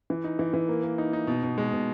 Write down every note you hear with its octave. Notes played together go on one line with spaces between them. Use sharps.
E3
D#4
E3
E3
A#3
A#3
D#4
D#4
B2
B2
G#3
B2